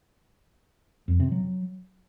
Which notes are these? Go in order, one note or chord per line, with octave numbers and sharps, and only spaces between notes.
F2
C3
F#3